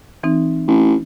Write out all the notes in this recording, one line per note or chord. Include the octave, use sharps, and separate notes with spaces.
E3 C4 D#4
A1